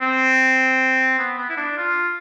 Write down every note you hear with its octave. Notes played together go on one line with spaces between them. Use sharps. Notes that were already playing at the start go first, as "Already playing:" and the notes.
C4
B3
B3
E4
D4
F4